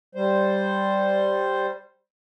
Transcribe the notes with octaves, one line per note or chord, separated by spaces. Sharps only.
G3 C5